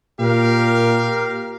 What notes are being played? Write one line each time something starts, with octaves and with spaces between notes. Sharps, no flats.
A#2 G4 A#4 F5